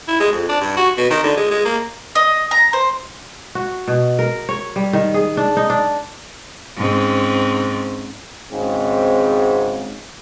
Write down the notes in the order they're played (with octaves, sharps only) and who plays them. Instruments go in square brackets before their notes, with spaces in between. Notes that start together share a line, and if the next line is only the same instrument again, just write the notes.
[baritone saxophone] E4
G#3
F2
D4
G2
F#4
B2
D#3
D3
G#3
G#3
A#3
[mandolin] D#5
A#5
C5
[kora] F#4
B2
A#4
C#5
G3
D#3
G#4
D4
D#4
D4
[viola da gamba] G#2 C4 C#4
[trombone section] G#1 G#2 C#3 C4